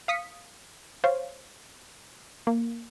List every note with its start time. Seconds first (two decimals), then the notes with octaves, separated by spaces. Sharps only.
0.08 F5 D#6 B6 C#7
1.04 C5 C#5 F5
2.47 A#3